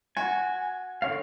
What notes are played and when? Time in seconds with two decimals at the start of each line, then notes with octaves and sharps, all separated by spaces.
0.17 F#4 G#5
1.02 D3 C#5 F5